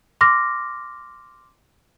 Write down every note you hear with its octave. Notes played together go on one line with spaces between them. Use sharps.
C6 D6 F6 A#6